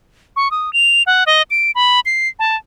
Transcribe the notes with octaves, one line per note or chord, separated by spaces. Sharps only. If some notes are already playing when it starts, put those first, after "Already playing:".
C#6
D#6
F7
F#5
D#5
D7
B5
C7
A5